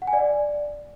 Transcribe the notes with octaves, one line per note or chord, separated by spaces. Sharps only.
F#5
G#5
D5